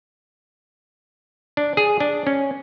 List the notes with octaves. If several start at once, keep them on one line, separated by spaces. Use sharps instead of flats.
D4
G#4
D4
C#4